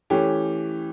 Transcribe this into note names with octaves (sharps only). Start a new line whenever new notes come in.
E3 A3 C#4 G4